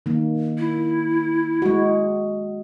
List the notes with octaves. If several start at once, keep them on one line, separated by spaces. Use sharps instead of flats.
D#3 A#3
E4
G#3 F#4